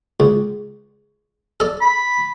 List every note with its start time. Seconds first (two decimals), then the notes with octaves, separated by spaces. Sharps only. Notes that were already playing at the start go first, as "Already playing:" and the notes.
0.20 C#2
1.60 A4 D5
1.81 B5